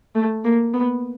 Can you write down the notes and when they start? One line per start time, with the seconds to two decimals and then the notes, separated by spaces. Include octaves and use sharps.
0.15 A3
0.44 A#3
0.74 B3